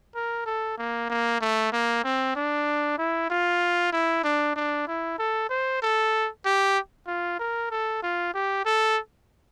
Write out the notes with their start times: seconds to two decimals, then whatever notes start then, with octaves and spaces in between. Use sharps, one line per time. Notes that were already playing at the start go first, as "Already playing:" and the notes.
0.15 A#4
0.46 A4
0.78 A#3
1.10 A#3
1.41 A3
1.72 A#3
2.04 C4
2.36 D4
2.98 E4
3.30 F4
3.92 E4
4.24 D4
4.56 D4
4.87 E4
5.19 A4
5.50 C5
5.82 A4
6.46 G4
7.07 F4
7.39 A#4
7.71 A4
8.03 F4
8.34 G4
8.65 A4